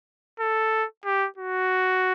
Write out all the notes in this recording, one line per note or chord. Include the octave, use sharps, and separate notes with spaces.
A4
G4
F#4